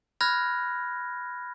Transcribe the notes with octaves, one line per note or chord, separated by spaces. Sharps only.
B5 F6 F#6 G#6 A#6